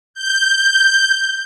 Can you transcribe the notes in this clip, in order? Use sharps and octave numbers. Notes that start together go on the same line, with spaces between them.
G6